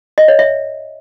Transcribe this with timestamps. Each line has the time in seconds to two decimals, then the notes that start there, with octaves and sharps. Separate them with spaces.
0.18 D#5
0.28 C#5
0.39 E5